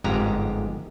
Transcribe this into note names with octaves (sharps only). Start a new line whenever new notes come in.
G1 F2 G#2 G#3 G4 A#5